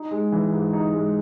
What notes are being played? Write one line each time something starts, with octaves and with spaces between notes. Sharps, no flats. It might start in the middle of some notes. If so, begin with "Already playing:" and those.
Already playing: D#4
G#3
E3
G#2
D#4
G#3